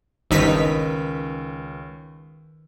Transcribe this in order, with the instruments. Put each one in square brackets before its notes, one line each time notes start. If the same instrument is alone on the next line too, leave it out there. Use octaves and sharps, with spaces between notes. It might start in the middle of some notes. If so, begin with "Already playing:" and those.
[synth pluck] G1 D#4 B6 [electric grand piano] C#2 C#4 E6 [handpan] D#3 B4